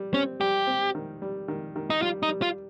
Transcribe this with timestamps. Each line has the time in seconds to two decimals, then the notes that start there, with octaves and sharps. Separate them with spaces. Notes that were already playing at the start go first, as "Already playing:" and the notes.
Already playing: G3
0.13 C4 C#4
0.40 G3 G4
0.67 C4
0.95 D#3
1.22 G3
1.48 D#3
1.76 D#3
1.90 D#4
2.02 G3 F4
2.23 D#4
2.28 G3
2.42 F4